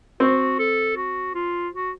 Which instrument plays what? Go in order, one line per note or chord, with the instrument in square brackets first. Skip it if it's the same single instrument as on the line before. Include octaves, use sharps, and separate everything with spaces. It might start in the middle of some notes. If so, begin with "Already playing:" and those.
[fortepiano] C4 [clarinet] F#4
[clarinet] A4
F#4
F4
F#4